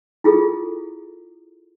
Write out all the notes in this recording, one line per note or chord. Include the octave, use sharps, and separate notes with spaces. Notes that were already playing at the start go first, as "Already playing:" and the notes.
E4 F4 G#4 A4